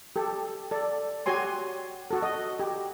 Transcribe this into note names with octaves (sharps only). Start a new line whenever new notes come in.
G4 A4
A4 D5
F#4 G4 C#5 G#5 C6
F#4 A4
D#5
G4